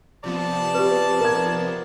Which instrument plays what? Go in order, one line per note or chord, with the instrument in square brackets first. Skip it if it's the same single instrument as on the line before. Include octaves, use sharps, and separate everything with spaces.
[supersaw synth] C3 F3 B3 [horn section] D5 A5
[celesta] G4 B4
[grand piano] A#4 G#6